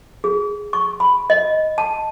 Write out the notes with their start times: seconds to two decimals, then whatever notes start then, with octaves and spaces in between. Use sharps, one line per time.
0.24 G#4
0.73 C#6
1.00 B5
1.30 D#5
1.78 A5